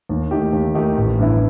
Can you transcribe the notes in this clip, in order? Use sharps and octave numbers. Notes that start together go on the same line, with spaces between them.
D#2
D#3 A3 D#4 G4
D#2
D#3 A3 D#4 G4
A1
G2 E3 B3 E4